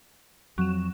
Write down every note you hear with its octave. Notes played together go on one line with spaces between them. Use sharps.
F2 F#3 E7